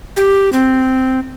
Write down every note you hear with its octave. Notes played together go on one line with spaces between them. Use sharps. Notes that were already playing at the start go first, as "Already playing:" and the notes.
G4
C4